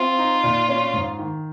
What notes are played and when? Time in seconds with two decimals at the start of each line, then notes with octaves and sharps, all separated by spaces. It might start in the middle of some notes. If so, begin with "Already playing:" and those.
Already playing: C4 F4
0.18 D#4
0.44 A#2
0.69 C#4
0.94 G#2
1.19 D#3